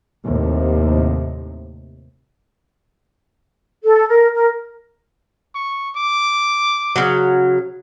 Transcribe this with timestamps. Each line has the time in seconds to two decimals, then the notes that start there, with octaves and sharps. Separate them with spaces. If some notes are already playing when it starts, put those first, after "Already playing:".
0.24 D#2 A2 C3
3.84 A4
4.08 A#4
4.34 A#4
5.55 C#6
5.96 D6
6.96 C#3 F#3